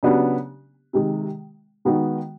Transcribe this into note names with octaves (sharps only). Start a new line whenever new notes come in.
C#3 F#3 B3 D4 G4
C3 D#3 G#3
D#3 G#3 B3 D#4 F#4